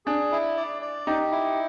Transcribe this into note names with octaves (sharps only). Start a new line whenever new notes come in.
D4 G#4
E4
D5
D5
D#4 G4
E4